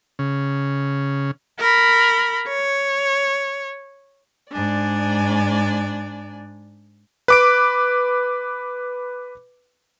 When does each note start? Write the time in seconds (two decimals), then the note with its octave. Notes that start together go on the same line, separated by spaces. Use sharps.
0.19 C#3
1.59 A#4 B5
2.47 C#5
4.51 G#2 D4 D5 G#5
7.28 B4 D6 D7